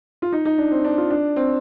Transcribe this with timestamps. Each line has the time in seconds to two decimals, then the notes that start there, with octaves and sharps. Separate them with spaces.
0.22 F4
0.32 D#4
0.45 D#4
0.58 D4
0.71 C4
0.85 D4
0.97 F4
1.10 D4
1.36 C4